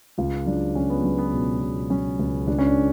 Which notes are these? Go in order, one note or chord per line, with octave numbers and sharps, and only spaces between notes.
C#2 F4
F#3 D4
C#2 C#4
B3
F#3 B3
B3
B2
B2
F#3 C#4
C#2
C#2 D4
C#4
D4